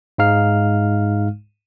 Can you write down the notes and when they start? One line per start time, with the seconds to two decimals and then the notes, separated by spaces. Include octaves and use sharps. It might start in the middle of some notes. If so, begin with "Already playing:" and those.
0.18 G#2 G#3 D#4 F5 F6